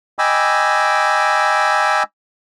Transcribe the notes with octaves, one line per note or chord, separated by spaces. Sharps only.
D#5 G5 G#5 B5 D6 E6